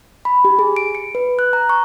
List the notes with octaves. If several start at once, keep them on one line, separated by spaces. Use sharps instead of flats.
B5
G4
G#4
D7
C#7
B4
F#6
A#5
C#6